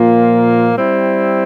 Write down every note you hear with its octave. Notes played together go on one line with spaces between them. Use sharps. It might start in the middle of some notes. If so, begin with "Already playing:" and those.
Already playing: A#2 F3 A#3 F4 A#4
G3 C4 E4